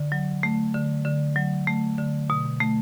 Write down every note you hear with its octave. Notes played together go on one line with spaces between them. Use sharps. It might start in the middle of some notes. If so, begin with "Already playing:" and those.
Already playing: D3
F#3
A3
D3
D3
F#3
A3
D3
B2
A3